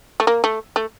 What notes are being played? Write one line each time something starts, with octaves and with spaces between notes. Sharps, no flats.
A3
A#3
A3
A3